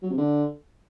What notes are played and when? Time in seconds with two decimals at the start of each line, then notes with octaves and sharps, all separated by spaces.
0.03 F#3
0.10 C3
0.17 D3